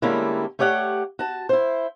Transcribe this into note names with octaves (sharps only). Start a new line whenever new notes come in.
D3 G3 G#3 A#3 C#4 E4
A3 G4 C#5 D5 F#5
F#4 A5
E4 C5